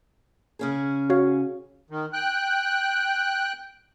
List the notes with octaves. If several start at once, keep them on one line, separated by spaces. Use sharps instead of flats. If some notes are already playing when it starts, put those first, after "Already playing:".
C#3 C#4 G#4
F#4 C#5 F5
D#3
G5 F#6